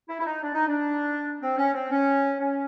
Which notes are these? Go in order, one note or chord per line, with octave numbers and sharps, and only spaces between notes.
E4
E4
D#4
D4
D#4
D4
C4
C#4
C4
C#4
C#4